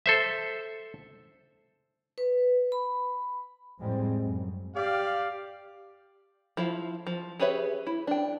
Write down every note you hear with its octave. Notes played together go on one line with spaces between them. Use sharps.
A4 C5 E5
B4
B5
F2 A2 G3 G#3 C4
F#2
G4 D5 F5
F3 E4 F5
F3
G4 G#4 B4 C#5 E5
E4
D4 G5